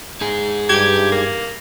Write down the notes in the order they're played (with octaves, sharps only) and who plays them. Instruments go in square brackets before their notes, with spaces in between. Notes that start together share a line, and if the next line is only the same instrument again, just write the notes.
[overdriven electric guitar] D#4 G#4
[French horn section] G2 [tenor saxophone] G4 [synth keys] G#6
[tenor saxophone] A#3